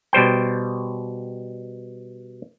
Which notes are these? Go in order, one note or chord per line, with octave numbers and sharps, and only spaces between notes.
B2 G3 C5 G5